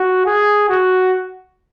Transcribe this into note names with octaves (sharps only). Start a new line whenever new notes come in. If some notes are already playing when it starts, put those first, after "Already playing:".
Already playing: F#4
G#4
F#4